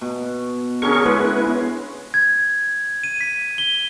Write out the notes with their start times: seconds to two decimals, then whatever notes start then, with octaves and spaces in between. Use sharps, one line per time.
0.01 B2
0.82 D3 C#4 G#4 A#4 C#6
1.06 G#3 B3 E4 B4
2.14 G#6
3.04 D#7
3.21 B6
3.58 G7